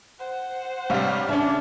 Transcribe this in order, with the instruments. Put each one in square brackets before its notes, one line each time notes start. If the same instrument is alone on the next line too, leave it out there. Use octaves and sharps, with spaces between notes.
[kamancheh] C5 F#5
[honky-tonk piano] G2 C#5 F5 [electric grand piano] C3 G3
[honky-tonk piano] C#3 [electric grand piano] C#4 E5 [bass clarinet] D4